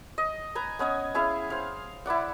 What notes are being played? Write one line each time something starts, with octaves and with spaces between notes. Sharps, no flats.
D#5
B4 G#5 A#5
B3 C#4 D#5 G#5
C#4 E4 G#4 F5
C5 F5
E4 B4 D5 F#5